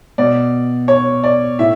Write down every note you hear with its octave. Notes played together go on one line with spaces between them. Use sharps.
B2 D5
C#5
D5
A2 E5